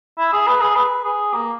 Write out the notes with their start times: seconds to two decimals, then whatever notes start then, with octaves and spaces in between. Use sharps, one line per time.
0.18 E4
0.33 G#4
0.47 B4
0.61 G#4
0.76 B4
1.05 G#4
1.33 A#3